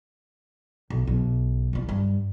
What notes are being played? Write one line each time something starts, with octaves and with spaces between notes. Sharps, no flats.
B1
B1
C2 F4
G2